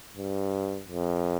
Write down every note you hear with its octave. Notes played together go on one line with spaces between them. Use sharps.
G2
F2